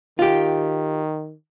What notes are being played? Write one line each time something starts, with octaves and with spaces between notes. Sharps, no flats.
D#3 F4 G4